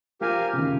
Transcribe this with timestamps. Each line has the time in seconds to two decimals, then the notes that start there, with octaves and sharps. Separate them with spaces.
0.21 F3 G4 A#4 F5 G#5
0.53 C#3
0.58 D#3